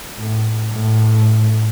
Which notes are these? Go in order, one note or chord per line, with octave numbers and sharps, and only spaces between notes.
A2
A2